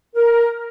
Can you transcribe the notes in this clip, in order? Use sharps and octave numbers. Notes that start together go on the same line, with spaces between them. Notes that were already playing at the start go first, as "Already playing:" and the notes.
A#4